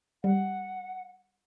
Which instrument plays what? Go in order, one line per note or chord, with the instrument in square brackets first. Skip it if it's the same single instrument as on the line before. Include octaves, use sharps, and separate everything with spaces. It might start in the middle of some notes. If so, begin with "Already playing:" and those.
[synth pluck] G3 [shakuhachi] F#5